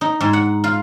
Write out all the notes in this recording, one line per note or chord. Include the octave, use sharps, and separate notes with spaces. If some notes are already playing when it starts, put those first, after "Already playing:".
D#4
G#2
F#5
F4